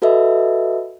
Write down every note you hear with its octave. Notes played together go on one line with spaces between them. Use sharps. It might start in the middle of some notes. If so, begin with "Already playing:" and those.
F#4 A4 B4 D#5 E5